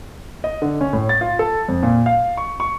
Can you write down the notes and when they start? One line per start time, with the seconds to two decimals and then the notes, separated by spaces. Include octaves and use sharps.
0.44 D#5
0.62 D3
0.81 C#4
0.93 A2
1.09 A6
1.21 F4
1.39 A4
1.68 F2
1.83 A#2
2.06 F5
2.37 C#6
2.60 C#6